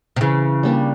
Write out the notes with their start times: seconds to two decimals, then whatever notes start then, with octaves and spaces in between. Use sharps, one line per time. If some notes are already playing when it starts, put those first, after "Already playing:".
0.16 C3
0.21 C#3 E3
0.63 G3 A#3 D4